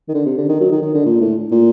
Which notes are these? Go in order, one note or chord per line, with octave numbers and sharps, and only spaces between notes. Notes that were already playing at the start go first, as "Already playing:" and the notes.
D#3
D3
C3
D3
D#3
F#3
D#3
D#3
D3
A#2
A2
A#2